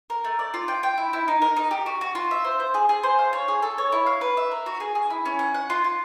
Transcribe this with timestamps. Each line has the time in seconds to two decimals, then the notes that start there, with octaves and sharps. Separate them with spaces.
0.10 A#4
0.24 A3
0.39 D5
0.54 F4
0.68 G5
0.83 G5
0.98 E4
1.13 E4
1.28 D#4
1.42 A#4
1.57 D#4
1.71 G4
1.86 F#4
2.01 F#4
2.15 F4
2.31 E5
2.44 C5
2.60 C5
2.74 G#4
2.89 G#4
3.03 C5
3.19 F5
3.33 C#5
3.48 G#4
3.62 A4
3.78 C#5
3.92 E4
4.06 F5
4.21 B4
4.37 E5
4.52 A#4
4.66 F#4
4.80 G#4
4.95 G#4
5.10 E4
5.26 C#4
5.39 F#5
5.54 F#5
5.70 F4
5.84 F4